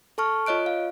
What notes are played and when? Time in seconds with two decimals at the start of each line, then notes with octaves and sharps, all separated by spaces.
0.18 A4 A5 C#6 F6
0.46 F4 C#5 D#5 F#6 D7
0.66 F5